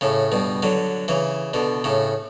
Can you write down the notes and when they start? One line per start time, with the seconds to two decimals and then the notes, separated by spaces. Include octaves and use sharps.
0.01 A2 C#3
0.32 G2 B2
0.63 D3 F#3
1.08 C#3 E3
1.54 B2 D3
1.84 A2 C#3